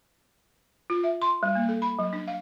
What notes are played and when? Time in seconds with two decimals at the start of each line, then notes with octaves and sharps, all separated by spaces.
0.90 F4
1.04 E5
1.22 C6
1.43 G3
1.55 A#3
1.69 A4
1.82 B5
1.99 F#3
2.13 D4
2.28 F5